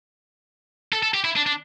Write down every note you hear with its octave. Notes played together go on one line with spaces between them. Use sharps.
A4
A4
G4
E4
D4
D4